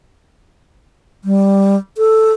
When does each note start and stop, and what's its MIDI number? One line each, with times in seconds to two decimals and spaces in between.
1.24 1.76 55
1.98 2.33 69